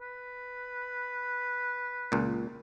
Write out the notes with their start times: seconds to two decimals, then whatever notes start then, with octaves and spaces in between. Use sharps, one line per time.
0.01 B4
2.12 C#2 A#2